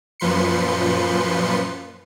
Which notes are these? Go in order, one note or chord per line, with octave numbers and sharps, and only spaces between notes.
F#2 A#2 F3 B4 C6 C#7